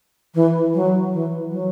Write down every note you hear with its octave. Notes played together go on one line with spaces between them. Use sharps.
E3
F#3
E3
F#3